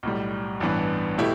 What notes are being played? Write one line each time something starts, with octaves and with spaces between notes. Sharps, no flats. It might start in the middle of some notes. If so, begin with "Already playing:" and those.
B1 A2 G3
A1 G2 E3 B3 D4
B2 A3 E4 G4